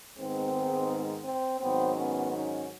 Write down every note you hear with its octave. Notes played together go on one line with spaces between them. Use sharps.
G#2 D#3 G#3 B3 C4
C4
G#2 D#3 F#3 B3 C4
B3 C#4
C#4 D#4